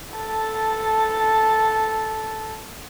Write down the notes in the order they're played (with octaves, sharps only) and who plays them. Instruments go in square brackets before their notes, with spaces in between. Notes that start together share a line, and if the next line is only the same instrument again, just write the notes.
[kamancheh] A4 A5